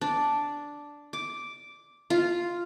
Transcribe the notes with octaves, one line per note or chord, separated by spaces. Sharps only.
D4
D6
F4